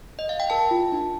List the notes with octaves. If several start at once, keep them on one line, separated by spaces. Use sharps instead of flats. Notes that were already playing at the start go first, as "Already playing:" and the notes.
D#5
F5
G5
A#4 A5
F4
D4